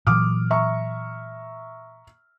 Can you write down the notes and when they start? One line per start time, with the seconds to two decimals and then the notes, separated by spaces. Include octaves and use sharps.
0.07 A#2 E3 F#3 D6 D#6 F6
0.51 E5 A#5 C#6